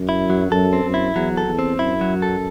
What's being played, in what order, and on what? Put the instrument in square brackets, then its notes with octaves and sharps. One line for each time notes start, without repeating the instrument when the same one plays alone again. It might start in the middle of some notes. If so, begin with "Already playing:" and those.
Already playing: [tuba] F#2
[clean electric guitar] E4
F#3
[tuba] F#2 [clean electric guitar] A4
[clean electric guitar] C4
[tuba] F#2
[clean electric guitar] E4
[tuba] E2 [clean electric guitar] F#3
[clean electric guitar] A4
[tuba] E2
[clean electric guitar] C4
[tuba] F#2 [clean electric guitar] E4
[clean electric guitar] F#3
A4